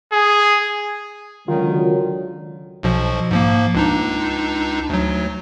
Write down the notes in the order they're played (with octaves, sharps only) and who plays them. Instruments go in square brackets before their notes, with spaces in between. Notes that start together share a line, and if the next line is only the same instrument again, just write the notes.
[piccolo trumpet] G#4
[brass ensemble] C#2 D3 F#3 [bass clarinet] D#3 [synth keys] F4
[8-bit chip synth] B1 B2 F3
G#2 F3 A#3
C#2 D4 D#4
D2 F#3